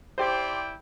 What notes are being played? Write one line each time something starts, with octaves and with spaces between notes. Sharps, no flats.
E4 G4 C5 D5 G5